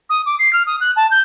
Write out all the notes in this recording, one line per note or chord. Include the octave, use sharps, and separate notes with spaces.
D#6
D6
C7
F6
D#6
F#6
A5
G6